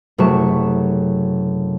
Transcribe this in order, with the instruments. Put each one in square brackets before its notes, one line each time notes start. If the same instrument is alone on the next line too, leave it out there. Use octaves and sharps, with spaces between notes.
[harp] F#1 C3 F#3 A3 C#6 E7